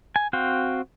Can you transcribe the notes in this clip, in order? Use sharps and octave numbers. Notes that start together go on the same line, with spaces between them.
G#5
C4 F#4 F5 G5